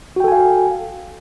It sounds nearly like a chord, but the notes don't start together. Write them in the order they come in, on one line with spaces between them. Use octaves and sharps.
F#4 G5 A4 G#5 F5